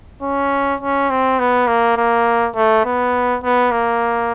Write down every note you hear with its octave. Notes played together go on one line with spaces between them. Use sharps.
C#4
C#4
C4
B3
A#3
A#3
A3
B3
B3
A#3